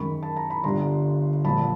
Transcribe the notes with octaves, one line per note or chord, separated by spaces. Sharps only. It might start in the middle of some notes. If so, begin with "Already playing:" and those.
Already playing: F#2 D#3 G#3 B5 C#6
A5
A#5
B5
G1 G2 D3 G3 A#5 C6
A#1 A#2 F#3 A5 B5